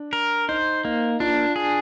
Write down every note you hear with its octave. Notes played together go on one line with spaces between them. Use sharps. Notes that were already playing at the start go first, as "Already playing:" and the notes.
Already playing: D4
A#4
D#4 C5
A#3 D#4
D4 F4
G#4